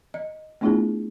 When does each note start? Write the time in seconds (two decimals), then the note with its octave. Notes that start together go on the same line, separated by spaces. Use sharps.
0.14 D#5
0.61 A3 B3 D4 E4 F4 G#4